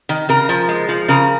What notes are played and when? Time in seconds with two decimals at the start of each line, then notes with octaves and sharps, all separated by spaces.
0.09 D#3
0.29 C#3 A#4
0.49 F3
0.68 G#3
0.89 F3
1.08 C#3 A#4